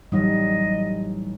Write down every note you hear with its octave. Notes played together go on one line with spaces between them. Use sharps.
A1 F#3 G3 D#4 D#5 D#6